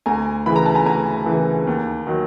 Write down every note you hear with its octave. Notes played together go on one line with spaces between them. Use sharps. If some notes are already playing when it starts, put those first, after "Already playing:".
D2 G#5 A#5
C#3 E3 B5
A#5
A5
G#5 A#5
D2 G#5 A#5
C#3 E3
D#2
D#3 F#3